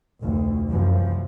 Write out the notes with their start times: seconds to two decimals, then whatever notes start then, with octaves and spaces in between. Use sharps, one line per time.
0.20 F1 D2
0.69 C2 F#2 C3 E3 F3